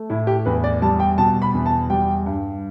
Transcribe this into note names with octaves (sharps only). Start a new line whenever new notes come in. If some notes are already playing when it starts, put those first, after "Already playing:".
Already playing: A3
A2 E4
G4
E2 B4
D5
G3 A5
G5
B2 A5
B5
E2
A5
G3 G5
G2